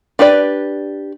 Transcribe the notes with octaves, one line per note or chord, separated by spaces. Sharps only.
D4 G4 B4 D5